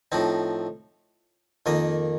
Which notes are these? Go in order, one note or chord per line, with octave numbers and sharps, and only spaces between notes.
A2 F3 C4 D#4
F2 D#3 A#3 D#5